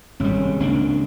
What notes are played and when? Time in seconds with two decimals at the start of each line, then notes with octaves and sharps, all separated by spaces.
0.20 G#1 C3 G3 G#3 C#4
0.60 C#2 A#3 D4